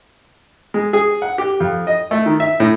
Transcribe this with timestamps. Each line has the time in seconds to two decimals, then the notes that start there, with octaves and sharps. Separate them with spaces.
0.74 G#3
0.93 G#4
1.22 F#5
1.38 G4
1.60 F2
1.87 D#5
2.11 A3
2.26 D#3
2.40 E5
2.60 A2